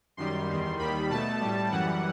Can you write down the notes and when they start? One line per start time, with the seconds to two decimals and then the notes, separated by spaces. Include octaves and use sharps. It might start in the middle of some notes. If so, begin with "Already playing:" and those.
0.17 F#2 D#3 G3 C6
0.48 E2 D#3 G3
0.79 D#2 D#3 G3 B5
1.10 B2 A3 A5
1.40 A2 G3
1.71 F#2 E3 G3 F#5